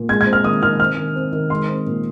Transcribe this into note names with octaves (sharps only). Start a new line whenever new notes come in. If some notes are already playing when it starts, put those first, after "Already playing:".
Already playing: A#2
G#3 G#6
G#6
C4
F6
D#3 D#6
D#3 F6
C4 F6
D#3
C4
D#3
G#3 C6
C4
A#2